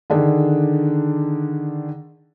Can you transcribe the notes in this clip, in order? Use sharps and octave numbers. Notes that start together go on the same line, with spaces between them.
D3 D#3 D4 G#4